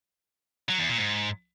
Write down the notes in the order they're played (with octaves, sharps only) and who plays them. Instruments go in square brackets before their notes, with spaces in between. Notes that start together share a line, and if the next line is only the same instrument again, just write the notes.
[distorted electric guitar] F#3
E2
A#2
G#2